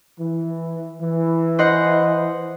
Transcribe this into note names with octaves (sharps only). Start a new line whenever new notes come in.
E3
E3
C5 D#5 F#5